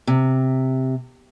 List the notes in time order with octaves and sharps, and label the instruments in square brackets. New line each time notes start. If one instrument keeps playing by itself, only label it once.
[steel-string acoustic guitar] C3